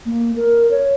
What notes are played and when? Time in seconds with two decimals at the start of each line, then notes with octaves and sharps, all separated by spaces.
0.06 A#3
0.36 A#4
0.71 C#5